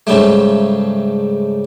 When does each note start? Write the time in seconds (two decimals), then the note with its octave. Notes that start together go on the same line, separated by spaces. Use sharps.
0.07 G#2 C#3 G3 A3